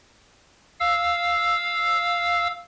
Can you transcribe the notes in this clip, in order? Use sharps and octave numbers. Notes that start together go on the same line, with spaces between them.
F5 E6